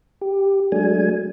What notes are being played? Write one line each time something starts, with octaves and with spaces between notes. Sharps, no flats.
G4
F#3 G#3 A3 D4 G#5